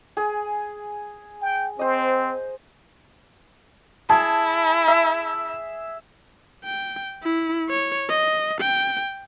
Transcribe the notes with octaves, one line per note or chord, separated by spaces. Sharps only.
G#4 G#5
G5
C4 C5 D#5
E4 G#4 A5
E5
G5
E4
C#5
D#5
G5